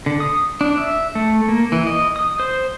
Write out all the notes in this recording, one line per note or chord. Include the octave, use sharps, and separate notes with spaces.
D3
D#6
D4
E5
A3
A#3
E3
D#5
D#6
C5